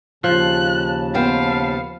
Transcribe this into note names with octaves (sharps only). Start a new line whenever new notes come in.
D#2 C#3 F3 A5 F#6
B3 C5 F5 G5